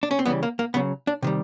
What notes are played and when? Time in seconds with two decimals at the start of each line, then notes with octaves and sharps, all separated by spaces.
0.03 D4
0.11 C#4
0.19 C4
0.26 C#3 E3 G3 B3
0.43 A#3
0.59 A#3
0.74 C#3 F#3 B3
1.07 D4
1.22 C3 D#3 G3